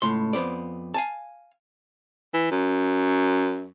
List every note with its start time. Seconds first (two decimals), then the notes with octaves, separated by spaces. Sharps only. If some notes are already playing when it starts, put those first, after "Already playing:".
0.02 C#2 A2 C6
0.33 F2 B3 C5 D5
0.94 F5 G#5 A5
2.33 E3
2.51 F#2